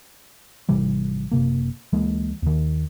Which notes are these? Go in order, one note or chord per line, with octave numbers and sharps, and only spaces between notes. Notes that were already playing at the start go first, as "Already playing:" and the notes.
G#1 C3 E3 G3
F#1 C3 A#3
D2 E3 G#3 A#3
D#2 D#3